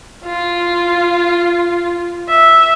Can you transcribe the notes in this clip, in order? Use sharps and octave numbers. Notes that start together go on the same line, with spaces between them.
F4
E5